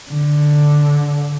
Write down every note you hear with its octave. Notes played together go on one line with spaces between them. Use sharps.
D3